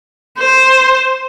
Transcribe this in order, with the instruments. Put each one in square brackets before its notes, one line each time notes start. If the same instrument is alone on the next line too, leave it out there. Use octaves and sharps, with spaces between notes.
[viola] C5